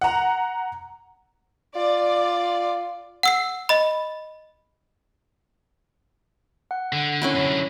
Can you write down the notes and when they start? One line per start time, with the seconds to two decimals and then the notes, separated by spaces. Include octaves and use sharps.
0.01 F#5 A#5
1.75 F4 D5
3.23 F#5 E6 C7
3.69 D#5 B5
6.71 F#5
6.93 D3
7.22 C#4 E4 B4
7.35 F#2 D3